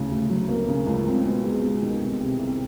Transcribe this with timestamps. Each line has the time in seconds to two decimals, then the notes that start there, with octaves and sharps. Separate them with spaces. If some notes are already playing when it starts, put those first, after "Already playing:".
Already playing: D2 C#3 E3
0.11 D2
0.30 F#3
0.49 A#3
0.68 C#3
0.86 C#2
1.07 C4
1.25 B2
1.44 G#3
1.63 B2
1.83 D#3
2.01 C2
2.20 C3
2.39 C2